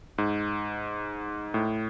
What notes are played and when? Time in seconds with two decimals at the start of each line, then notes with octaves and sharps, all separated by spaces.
0.18 G#2
1.54 A2